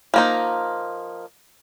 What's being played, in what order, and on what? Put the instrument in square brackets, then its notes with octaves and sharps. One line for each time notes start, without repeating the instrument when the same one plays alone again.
[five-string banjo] F3 A#3 D#4